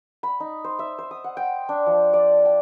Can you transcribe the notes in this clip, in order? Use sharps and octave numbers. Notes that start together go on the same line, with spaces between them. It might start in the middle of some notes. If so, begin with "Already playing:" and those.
B5
D#4
C5
E5
C5
D#6
F#5
G5
D4
F3
D5
G5